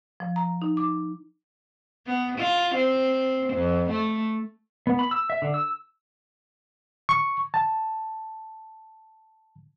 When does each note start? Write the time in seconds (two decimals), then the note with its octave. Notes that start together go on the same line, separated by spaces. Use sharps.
0.20 F3
0.36 A#5
0.62 D#4
0.77 D6
2.07 B3
2.38 F4
2.75 C4
3.54 F2
3.90 A3
4.87 B3
4.99 B5
5.11 E6
5.30 E5
5.42 D3
5.54 E6
7.09 C#6
7.54 A5